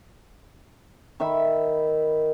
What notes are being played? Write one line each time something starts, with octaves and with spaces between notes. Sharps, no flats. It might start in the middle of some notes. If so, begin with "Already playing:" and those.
D#3 E5 B5